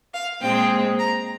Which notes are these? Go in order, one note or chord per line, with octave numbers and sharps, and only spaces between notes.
F5
A#2 G#3 C4 G5
A#5